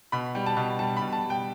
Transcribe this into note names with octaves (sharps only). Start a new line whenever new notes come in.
B2 B5
G3
A5
B2
G3 A5
B2 B5
A5
G3
G5